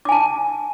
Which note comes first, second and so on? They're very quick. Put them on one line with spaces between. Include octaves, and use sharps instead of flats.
D6 G#5 A5